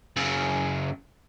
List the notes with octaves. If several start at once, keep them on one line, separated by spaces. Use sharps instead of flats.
F#2 C#3